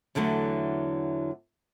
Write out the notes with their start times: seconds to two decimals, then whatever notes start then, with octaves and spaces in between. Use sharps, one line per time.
0.15 E2 D3 E3 F#3 A3